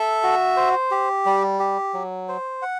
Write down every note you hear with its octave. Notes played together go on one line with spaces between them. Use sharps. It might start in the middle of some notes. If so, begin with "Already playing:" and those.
Already playing: A4 E5
F#4
C5
G4
G3
G4
F#3
C5
F#5